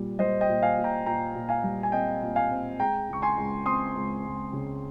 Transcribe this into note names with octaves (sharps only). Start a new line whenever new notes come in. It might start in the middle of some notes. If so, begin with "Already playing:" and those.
Already playing: A#2 G3
G3 C5 D#5
D#5 G5
A#2
F5 G#5
A#2
G5 A#5
A#2 G5 A#5
A#2
F5 G#5
G3
G#5
C4 D#5 G5
A#2
F5 G#5
C4
G#3 G5 A#5
C#2 C#6
G#5 C6
C#2
C4 C6 D#6
C#2
C#2
C#3